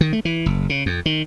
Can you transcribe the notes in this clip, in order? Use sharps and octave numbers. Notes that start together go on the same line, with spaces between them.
D#3
A3
E3
F#1
C#3
F2
D#3